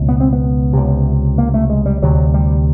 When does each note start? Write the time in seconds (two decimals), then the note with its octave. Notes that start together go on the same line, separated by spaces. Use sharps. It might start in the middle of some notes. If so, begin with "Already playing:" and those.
Already playing: C#2 B2
0.09 B3
0.20 C4
0.33 B3
0.73 C#2 C3
1.38 A#3
1.54 A3
1.69 G#3
1.86 G3
2.02 D2 C3 F#3
2.34 G3